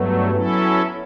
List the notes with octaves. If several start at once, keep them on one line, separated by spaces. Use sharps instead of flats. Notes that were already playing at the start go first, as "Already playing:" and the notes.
Already playing: G2 F#3 A3 B3
F#3 C#4 E4 A4